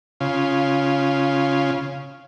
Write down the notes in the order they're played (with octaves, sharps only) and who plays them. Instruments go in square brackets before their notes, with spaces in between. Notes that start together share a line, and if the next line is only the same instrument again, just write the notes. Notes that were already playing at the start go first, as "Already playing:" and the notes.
[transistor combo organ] C#3 F4